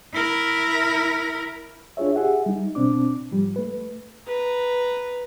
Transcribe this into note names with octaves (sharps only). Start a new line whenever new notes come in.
E4 A#4
D4 F4 G#4 C#5 E5
G4 G#4 E5 F#5
G3 D#4
B2 C4 D4 D6
G#2 F3 G3
A3 B4
B4 A#5